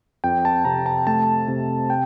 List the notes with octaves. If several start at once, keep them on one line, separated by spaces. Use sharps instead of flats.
F2 G5
A5
C3 A#5
A5
A3 A5
C3
G5